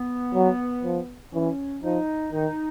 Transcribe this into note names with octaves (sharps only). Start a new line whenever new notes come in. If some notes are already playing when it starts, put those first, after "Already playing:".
Already playing: B3
F#3
F3
E3 C#4
F3 D#4
D#3 D#4